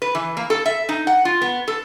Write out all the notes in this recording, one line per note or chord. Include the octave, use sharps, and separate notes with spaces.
B4
E3
A#3
A4
E5
D#4
F#5
F4
B3
A4